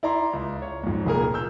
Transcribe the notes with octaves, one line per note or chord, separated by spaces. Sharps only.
E4 D5 A#5 C6
C#2
C#5
F2 G#2
F1 A#2 G#4 A#4
E6 G6